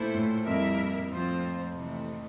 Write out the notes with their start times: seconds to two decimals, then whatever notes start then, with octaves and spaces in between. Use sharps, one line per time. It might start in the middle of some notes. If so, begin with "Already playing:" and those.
Already playing: A#2 A3 E4 A4 C5
0.14 A2
0.46 F2 G3 A#3 E4 A#4 E5
1.09 F3 A3 C4 F4 C5
1.74 C3 E3 A3